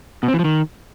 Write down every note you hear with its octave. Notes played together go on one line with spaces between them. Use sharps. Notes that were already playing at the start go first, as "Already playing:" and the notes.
B2
C4
E3
F3
D#3